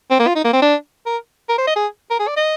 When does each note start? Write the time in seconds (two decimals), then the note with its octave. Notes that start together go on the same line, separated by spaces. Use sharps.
0.11 C4
0.20 A#3
0.27 F4
0.36 D#4
0.45 A#3
0.53 C4
0.62 D4
1.06 A#4
1.49 A#4
1.58 C5
1.68 D#5
1.76 G#4
2.11 A#4
2.20 G#4
2.28 D5
2.37 D#5